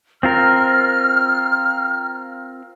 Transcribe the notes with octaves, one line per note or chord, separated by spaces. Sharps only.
C4 F4 A#4 F6